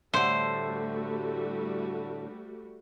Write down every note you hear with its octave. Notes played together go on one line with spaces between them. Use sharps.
A2 D3 G3 A3 F#4 C5